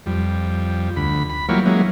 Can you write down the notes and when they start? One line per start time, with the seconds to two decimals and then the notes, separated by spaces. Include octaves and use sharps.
0.06 F2 G3
0.96 D2 B5
1.30 B5
1.49 E3 F#3 G3 A#3 F4 C#5
1.66 E3 F#3 G#3 A#3 C#4